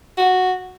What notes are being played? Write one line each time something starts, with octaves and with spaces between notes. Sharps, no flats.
F#4